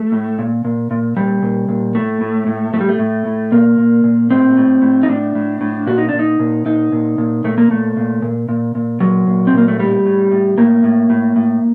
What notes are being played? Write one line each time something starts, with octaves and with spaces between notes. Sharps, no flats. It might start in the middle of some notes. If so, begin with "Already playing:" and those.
Already playing: A3
A2
A#2
A#2
A#2
A#2 G3
A#2
A#2
A2 A3
A2
A2
A2 A3
G3
A3
A2
A2
A#2 A#3
A#2
A#2
A2 C4
A2
A2
D#4
A2 D4
A2
A2
A#2 F#4
D#4
A#2 D4
D#4
A#2
A#2 D#4
A#2
A#2
A#2 A3
A#3
A#2 A3
A#2
A#2
A#2
A#2
A#2 F#3
A#2
C4
A#2 A#3
A3
A2 G3
A2
A2
A2 A#3
A2
A2
A2